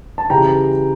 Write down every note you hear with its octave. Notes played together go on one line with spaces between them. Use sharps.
A5
C#3 E3 G3 G5 A#5